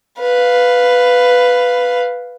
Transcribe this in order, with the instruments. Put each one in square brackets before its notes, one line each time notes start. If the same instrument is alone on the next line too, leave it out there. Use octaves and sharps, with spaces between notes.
[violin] B4 F5